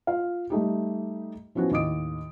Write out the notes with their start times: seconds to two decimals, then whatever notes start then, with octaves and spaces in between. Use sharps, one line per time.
0.07 F4 F5
0.50 G3 A3 D#4 G4
1.55 E3 F3 B3 C#4 F4 F#4
1.71 D#2 A2 D#5 D6 D#6 D7